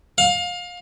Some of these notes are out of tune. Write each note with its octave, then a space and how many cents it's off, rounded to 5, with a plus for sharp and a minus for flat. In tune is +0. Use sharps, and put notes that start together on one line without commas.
F5 +25